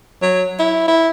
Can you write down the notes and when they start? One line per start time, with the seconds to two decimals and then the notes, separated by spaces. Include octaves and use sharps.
0.22 F#3
0.59 E4
0.88 E4